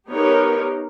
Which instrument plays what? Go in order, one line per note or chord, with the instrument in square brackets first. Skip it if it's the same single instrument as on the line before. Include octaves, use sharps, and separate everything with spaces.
[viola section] B3 D#4 G4 A#4 C#5